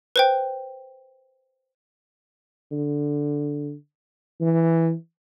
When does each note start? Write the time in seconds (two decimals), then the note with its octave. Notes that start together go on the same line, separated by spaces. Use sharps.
0.16 B4 C5 G5
2.71 D3
4.41 E3